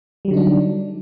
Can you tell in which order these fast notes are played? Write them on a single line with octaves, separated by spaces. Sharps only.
G3 F#3 D3 D#4 D4